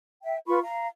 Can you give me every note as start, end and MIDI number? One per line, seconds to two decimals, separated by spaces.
0.23 0.38 76
0.23 0.38 79
0.47 0.59 65
0.47 0.59 71
0.47 0.59 83
0.47 0.59 85
0.63 0.87 77
0.63 0.87 82